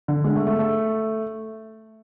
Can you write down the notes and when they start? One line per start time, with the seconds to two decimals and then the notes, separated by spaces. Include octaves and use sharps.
0.08 D3
0.24 G#3
0.36 A3
0.47 A3
0.59 A3